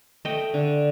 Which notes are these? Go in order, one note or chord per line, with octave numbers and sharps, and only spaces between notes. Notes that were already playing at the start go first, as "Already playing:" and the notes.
A3 D#5 G5
D3